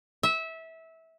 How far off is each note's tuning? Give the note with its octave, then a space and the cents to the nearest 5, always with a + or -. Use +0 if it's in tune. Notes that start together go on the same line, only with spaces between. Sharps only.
E5 -20